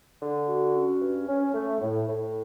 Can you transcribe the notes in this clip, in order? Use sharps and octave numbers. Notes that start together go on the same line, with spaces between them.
D3
F#4
C#4
G2
C#4
A3
A2
A2